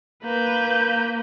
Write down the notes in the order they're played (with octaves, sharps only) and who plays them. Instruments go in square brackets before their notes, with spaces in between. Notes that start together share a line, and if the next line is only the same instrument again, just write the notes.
[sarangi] A#3 [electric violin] B4 G6